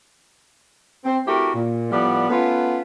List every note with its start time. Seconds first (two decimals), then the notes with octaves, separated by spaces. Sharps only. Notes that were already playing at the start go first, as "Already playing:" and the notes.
1.05 C4
1.26 A3 C4 E4 F#4 G4 A#4
1.54 A#2
1.91 A2 F3 G3 B3 D5 F#5
2.29 A3 B3 C#4 F4 B4